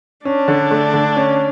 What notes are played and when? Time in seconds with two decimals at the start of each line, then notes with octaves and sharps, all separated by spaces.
0.25 C#4 D4
0.48 D3
0.71 A3
0.93 D3
1.17 C#4